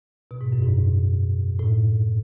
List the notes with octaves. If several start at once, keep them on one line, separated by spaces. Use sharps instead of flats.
B2
G#2
F#2
G#2
A2